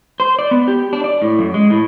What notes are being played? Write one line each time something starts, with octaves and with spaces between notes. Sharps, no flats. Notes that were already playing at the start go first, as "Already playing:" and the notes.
C5
D5
B3
G4
D4
D5
A2
F#2
G#3
A2